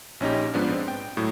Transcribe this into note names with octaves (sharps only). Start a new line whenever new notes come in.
A#1 C#4 D#4 G4
G#2 F3 B3 D4
C4
G5
A2 F#3